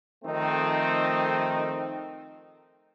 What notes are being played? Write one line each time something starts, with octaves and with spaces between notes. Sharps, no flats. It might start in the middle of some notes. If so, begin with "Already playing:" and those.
D#3 F3 A3 C4 D#4